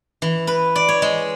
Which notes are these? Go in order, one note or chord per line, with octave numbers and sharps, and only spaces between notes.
E3
B4
D5
C#5
G#3